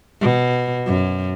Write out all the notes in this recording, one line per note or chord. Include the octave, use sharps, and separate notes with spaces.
B2
F#2